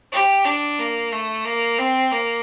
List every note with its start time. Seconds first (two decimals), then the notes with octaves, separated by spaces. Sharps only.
0.12 G4
0.45 D4
0.79 A#3
1.12 A3
1.45 A#3
1.79 C4
2.12 A#3